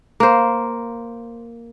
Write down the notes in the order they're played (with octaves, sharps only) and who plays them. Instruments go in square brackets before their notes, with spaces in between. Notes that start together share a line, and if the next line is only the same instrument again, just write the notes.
[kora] A#3 C5